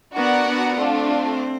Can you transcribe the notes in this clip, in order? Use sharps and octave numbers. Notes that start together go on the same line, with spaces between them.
B3 D4 F#4 A#4 D5 F#5
B3
A3 C4 D4 F4